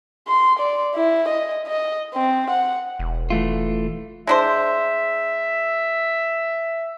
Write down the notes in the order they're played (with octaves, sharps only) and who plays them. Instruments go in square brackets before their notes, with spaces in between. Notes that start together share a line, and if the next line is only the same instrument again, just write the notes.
[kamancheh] C6
D5
E4
D#5
D#5
C4
F#5
[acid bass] E1
[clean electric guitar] E3 A3 F4
[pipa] G#3 D4 C5 [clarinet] E5